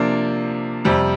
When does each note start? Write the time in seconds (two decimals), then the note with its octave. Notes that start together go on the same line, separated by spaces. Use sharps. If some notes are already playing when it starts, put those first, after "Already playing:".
Already playing: C3 F3 A#3 D4
0.85 F2 C3 G3